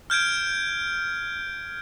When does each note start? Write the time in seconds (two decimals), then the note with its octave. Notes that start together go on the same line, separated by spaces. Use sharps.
0.10 F6 G6 G#6 D7